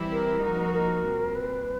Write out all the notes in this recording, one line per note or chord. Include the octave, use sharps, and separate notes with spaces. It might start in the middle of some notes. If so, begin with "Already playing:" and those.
Already playing: E3 G3 C4 E4 G4
A#4
F3 A#3 D#4 F#4
A#4
A#2 G3 C4
B4